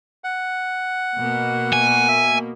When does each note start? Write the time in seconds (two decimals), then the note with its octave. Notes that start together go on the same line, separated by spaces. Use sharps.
0.24 F#5
1.17 B2 A#3
1.73 G#5
2.08 E5